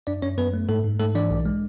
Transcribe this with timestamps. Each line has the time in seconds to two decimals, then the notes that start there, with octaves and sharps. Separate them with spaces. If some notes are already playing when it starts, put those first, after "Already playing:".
0.07 F#2 D4 D5
0.22 F#2 C#4 C#5
0.38 F#2 B3 B4
0.54 A3
0.69 G#2 A3 A4
0.84 G#2
1.00 G#2 A3 A4
1.15 E3 D4 D5
1.31 B1
1.45 G#3